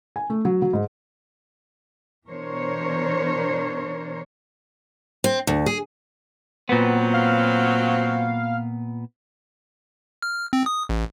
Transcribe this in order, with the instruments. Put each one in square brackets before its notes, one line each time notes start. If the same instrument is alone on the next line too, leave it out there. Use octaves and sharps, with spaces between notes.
[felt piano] G#5
A3
F#3
F#3
G#2
[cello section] B2 E3 D4 A#4 C5 C#5
[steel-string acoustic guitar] C4
D2
G#4
[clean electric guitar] A#2 B3 [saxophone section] F#3 C4 [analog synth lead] B4
[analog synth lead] F5
[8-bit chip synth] F6
C4
D#6
A1